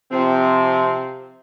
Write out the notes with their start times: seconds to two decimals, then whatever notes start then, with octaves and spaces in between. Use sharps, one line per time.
0.11 C3 F3 C4